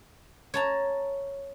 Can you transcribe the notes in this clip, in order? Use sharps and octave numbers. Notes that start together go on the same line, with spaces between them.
C#5 A5 A#5